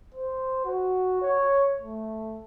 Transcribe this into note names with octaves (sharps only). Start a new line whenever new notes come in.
C5
F#4
C#5
A3